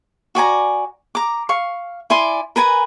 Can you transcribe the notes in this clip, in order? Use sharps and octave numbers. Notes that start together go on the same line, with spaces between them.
F#4 D5 G#5 A#5
A#5 D6
F5 C#6
E4 D5 G#5 C6
A#4 B4 G#5 A#5